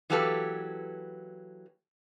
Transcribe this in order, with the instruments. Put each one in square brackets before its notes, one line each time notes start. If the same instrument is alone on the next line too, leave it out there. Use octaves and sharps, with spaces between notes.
[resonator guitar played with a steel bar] E3 F#3 A#3 G4 A4 B4